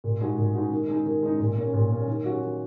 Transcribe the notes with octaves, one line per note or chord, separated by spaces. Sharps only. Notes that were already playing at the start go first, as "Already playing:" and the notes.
A#2
G#3 D#4 F#4
A#2
G#3 D#4 F#4
D#3
G#3 D#4
D#3
G#3 D#4
A#2
A#3 C#4
A#2
A#3 C#4
D#3
F#3 C#4 F#4
D#3